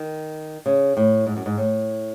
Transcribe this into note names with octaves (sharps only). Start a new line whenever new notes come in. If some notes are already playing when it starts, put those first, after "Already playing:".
Already playing: D#3
C#3
A2
G#2
F#2
G#2
A2